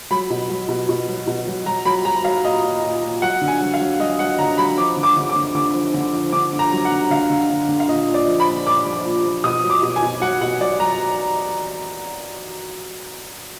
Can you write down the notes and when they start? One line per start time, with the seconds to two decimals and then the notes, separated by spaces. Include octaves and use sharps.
0.11 F#3 B5
0.30 B2
0.50 F#3
0.69 B2
0.89 B2
1.08 F#3
1.27 B2
1.47 F#3
1.66 F#3 A#5
1.85 F#3 B5
2.05 F#3 A#5
2.24 F#3 F5
2.44 A#2 D#5
2.64 A#2
2.83 A#2
3.03 A#2
3.22 F#3 F#5
3.41 D3
3.48 G#5
3.61 F#3
3.74 F5
3.80 F#3
3.99 F#3 D#5
4.19 F#3 F#5
4.39 D3 A#5
4.58 F#3 B5
4.77 F3 D6
4.97 D3
5.03 D6
5.16 D3
5.29 D6
5.36 D3
5.55 D3 D6
5.74 F3
5.94 D3
6.14 F3
6.32 D3 D6
6.53 D3
6.59 A#5
6.72 F#3
6.85 F#5
6.92 D3
7.10 D3 F5
7.30 D3
7.50 D3
7.69 D3
7.80 F5
7.88 A#2 D#5
8.08 A#2
8.14 D5
8.27 F3
8.40 B5
8.47 A#2
8.67 A#2 D6
8.85 F3
9.05 A#2
9.24 F3
9.44 B2 D#6
9.64 F#3
9.70 D6
9.83 B2
9.96 G#5
10.02 B2
10.21 F#3 F#5
10.41 B2 F#5
10.60 F#3 D5
10.80 F#3 A#5